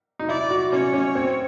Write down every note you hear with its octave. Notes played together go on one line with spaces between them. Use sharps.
D#4
E4 D5
F#4
C#4 C#5
C#4
C4